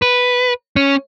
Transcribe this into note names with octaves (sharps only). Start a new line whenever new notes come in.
B4
C#4